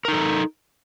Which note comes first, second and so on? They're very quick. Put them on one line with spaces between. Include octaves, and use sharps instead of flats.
A#4 D#4 A4